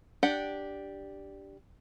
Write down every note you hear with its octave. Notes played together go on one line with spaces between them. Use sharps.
D4 G4 F#5